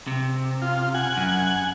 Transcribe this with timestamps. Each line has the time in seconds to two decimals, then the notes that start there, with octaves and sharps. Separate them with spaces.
0.07 C3
0.62 F4
0.94 F#5 G#5
1.17 F#2